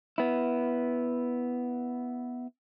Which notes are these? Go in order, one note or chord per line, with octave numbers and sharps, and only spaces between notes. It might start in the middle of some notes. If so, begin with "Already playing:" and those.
B3 E4